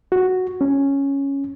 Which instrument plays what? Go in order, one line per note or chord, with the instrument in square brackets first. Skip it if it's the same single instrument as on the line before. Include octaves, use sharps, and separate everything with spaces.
[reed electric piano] F#4
C#4